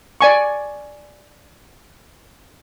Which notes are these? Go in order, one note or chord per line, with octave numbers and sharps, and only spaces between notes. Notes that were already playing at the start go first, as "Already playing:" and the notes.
D5 G#5 C#6